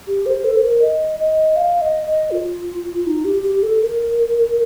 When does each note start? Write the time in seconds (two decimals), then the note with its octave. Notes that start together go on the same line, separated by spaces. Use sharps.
0.07 G4
0.26 C5
0.44 A4
0.57 C5
0.63 A#4
0.82 D#5
1.20 D#5
1.56 F5
1.81 D#5
2.07 D#5
2.31 F4
3.07 D#4
3.25 G4
3.43 G4
3.63 A4
3.82 A#4